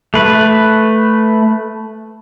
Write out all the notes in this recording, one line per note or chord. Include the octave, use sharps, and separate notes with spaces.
A3 B4